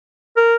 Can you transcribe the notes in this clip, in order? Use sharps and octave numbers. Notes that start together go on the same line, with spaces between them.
A#4